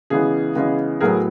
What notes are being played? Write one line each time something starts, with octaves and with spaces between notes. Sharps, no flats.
C#3 E3 G#3 B3 G#4
C#3 E3 G#3 B3
A2 F#3 B3 G#4 A#4